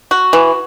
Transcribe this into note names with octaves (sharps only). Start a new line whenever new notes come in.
F#4
E3